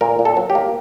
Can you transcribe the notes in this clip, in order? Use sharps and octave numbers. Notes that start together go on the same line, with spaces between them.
A#2 A#4
A#2
A4
F#3
G4
A#3